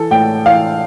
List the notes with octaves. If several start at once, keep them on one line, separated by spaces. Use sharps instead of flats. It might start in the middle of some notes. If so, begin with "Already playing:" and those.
Already playing: E3 A4
A2 G5
E3 F5